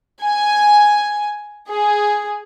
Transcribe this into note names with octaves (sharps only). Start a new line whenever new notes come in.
G#5
G#4